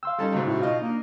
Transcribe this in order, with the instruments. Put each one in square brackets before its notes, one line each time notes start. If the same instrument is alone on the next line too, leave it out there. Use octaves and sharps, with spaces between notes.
[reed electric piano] F5 C6 E6 [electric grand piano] G5
[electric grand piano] G3 C#4 D#4 [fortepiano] A4 A5
[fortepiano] G#2 C#3 F#3 [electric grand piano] D#4
[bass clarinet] A2 [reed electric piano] E4 F#4
[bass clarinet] B2 [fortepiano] F4 D#5 [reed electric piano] F5
[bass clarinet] A#3 [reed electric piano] D4